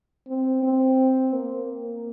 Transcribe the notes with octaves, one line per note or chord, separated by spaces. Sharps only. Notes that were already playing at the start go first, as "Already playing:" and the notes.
C4
C4
A#3